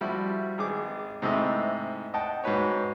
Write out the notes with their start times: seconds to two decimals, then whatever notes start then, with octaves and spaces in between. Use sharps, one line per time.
0.01 F3 G3 E4 F#4
0.58 G#1 G#4 D6
1.22 G#2 C3 A3 E4 D#5
2.14 D#5 F#5 G5 A5
2.44 G#2 F#4 B4 C#5